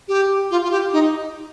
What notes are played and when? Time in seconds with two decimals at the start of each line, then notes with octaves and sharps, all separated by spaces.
0.08 G4
0.51 F4
0.64 F4
0.71 G4
0.93 D#4